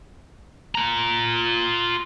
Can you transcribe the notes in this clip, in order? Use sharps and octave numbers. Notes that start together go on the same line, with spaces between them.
F4 A#5